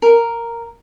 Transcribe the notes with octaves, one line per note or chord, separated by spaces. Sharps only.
A#4